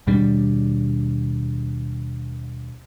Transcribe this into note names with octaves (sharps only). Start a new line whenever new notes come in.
D#2 B2 G3 D4